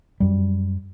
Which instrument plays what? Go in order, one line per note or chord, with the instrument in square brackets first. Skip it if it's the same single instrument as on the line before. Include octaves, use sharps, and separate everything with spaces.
[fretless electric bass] F#2 G3